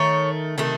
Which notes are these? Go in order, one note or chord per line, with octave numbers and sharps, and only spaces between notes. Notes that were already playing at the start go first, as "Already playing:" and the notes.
Already playing: D#3 A3 C#5
C3 D#3 A3